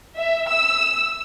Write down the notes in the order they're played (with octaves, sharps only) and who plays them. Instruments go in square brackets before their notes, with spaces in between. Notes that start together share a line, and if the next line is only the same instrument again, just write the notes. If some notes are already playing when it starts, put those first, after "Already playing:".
[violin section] E5
E6